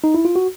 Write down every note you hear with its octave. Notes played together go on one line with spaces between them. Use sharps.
D#4
E4
F4
F#4